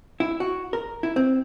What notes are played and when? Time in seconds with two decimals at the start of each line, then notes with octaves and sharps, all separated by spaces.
0.20 E4
0.40 F#4
0.73 A#4
1.03 E4
1.16 C4